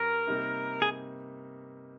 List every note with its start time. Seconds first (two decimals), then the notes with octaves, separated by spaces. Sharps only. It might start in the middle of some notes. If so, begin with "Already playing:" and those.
Already playing: G2 G3 C#4 A#4
0.27 C3 G3 A#3 D#4
0.82 G#4